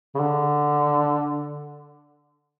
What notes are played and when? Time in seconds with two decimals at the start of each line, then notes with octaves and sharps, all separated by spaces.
0.15 C#3
0.20 D3